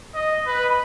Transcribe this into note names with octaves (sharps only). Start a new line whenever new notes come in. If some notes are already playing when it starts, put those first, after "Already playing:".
D#5
B4